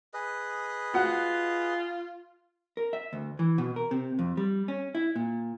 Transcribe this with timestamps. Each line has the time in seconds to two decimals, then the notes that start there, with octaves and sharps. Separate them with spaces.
0.14 G#4 B4 D#5
0.94 F4 F#4 F#5
2.77 A#4
2.93 E5
3.13 D2
3.39 E3
3.58 B2
3.76 A#4
3.91 C3
4.19 F2
4.37 G3
4.68 C#4
4.95 E4
5.16 A#2